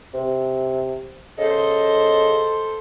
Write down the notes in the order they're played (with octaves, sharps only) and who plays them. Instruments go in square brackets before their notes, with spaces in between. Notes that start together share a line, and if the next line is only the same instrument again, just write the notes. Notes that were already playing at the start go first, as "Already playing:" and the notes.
[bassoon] C3
[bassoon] C#3 [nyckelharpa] A4 C5 [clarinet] D#5